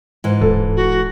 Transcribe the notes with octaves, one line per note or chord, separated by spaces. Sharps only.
G#2 E3
D1 A4
F#4